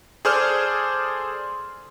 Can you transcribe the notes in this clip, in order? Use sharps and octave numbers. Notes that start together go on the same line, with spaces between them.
G#4 A4 C5 D5 C6 F6